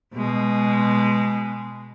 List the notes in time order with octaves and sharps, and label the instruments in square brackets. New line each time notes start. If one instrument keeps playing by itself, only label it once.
[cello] B2 G#3